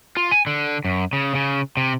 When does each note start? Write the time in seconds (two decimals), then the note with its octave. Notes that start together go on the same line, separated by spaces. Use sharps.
0.17 F4
0.31 G#5
0.47 D3
0.85 F#2
1.13 C#3
1.35 C#3
1.77 C3